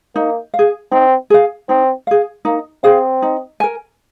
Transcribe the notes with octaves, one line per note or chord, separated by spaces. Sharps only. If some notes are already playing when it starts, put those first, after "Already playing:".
A#3 D#4
F5
G#4
C4 D#4
G#4 F5
C4 D#4
G#4 F5
A#3 D#4
C4 G#4 F5
D#4
A#4 G#5